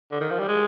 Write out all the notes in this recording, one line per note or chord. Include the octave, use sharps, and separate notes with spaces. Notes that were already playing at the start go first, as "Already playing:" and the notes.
D3
D#3
F3
G3
G#3